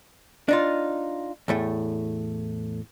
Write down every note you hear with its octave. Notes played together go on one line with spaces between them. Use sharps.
D4 D#4 F4
E2 A2 A3